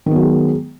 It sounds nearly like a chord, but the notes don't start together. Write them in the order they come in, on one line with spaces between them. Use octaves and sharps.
D#3 B3 F#3 G#3